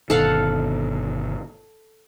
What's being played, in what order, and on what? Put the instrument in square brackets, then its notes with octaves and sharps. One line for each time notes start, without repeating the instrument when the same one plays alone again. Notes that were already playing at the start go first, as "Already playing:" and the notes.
[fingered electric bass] G1 B2 D#3 [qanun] A4 F5 F#5